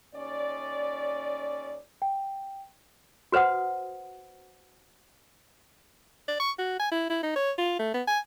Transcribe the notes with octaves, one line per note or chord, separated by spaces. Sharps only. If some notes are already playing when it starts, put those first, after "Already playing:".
D#2 C#4 D5
G5
F#4 B4 C5 F#5 D#6
D5
C#6
F#4
G#5
E4
E4
D#4
C#5
F4
A3
B3
G#5